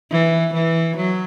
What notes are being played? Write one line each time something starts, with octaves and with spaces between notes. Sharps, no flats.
E3
E3
F#3